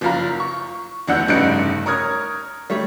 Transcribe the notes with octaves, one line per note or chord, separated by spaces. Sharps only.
F#1 F3 F5 A#5
C#6
F1 E2 D4 F#5 E6 G6
F1 G2 C#3 D#4 F#6 C#7
A#4 C#5 D#6 F6 G#6
G3 A3 C#5